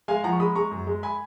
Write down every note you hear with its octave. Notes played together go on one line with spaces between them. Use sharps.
G#3 F5 G#5
F3 F#5 A#5
C#6
G#3 B5 D#6
G#3 A#5 C#6
F#2
G#3
G#5 B5